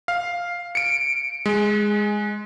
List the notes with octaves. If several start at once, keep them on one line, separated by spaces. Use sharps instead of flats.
F5
C#7 D7
G#3